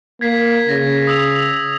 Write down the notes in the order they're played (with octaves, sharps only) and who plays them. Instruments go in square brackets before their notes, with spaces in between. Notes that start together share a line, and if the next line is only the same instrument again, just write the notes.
[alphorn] A#3 [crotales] G#6 B6 C7
[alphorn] C#3 [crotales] A#6
[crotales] D#6 E6 F7